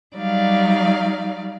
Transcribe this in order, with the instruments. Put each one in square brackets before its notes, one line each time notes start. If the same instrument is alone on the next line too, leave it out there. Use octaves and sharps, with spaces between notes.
[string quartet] F#3 G3 D#4 D5 F5